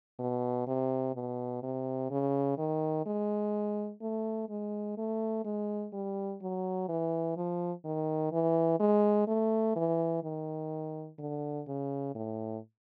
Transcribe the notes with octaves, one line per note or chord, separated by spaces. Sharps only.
B2
C3
B2
C3
C#3
D#3
G#3
A3
G#3
A3
G#3
G3
F#3
E3
F3
D#3
E3
G#3
A3
E3
D#3
D3
C#3
A2